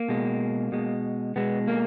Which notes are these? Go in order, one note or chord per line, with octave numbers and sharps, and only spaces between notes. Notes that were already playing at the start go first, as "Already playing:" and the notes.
Already playing: A#3
B2 G#3
B2 G#3
B2 G#3 B3
A#3